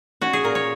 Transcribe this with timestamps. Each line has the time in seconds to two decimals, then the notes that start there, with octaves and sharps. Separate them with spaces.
0.22 C#4 F#4
0.33 G#4
0.44 A#2 A#4
0.55 C#5